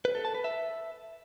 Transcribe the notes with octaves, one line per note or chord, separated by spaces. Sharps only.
B4
A4
A5
B4
E5